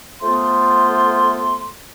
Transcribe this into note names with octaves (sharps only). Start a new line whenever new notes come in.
A3 B3 F4 C5 C6